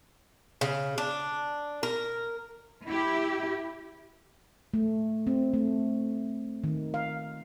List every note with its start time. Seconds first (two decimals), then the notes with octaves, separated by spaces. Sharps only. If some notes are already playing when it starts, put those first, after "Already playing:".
0.61 C#3
0.98 D4
1.83 A#4
2.85 E4 G4
4.74 A3
5.27 C4
5.54 A3
6.64 D#3
6.94 F5